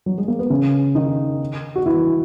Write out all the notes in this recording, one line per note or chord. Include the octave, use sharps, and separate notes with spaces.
F#3
G#3
A#3
B3
C#3 C#4
D#3 D#4
F#4
E3 E4